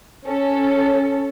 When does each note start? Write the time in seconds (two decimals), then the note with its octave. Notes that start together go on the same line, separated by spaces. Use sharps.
0.24 C#4 A4